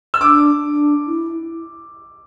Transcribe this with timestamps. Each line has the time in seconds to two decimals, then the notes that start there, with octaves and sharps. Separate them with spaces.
0.14 E6
0.21 D4 D6
0.64 D4
1.07 E4